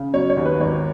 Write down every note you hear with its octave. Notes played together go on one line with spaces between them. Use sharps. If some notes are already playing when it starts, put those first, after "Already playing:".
Already playing: C#3
F#3 C#5
C#5
D#2
B4
G#1 C#5